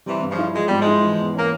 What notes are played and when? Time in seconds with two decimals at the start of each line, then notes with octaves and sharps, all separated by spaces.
0.06 C3 E3 G3
0.22 G2
0.30 C#3 F3
0.38 E4
0.54 F3 G#3
0.67 G#2 G3
0.79 F3 G#3
0.87 E4
1.03 E3
1.19 E2
1.34 A#3 C#4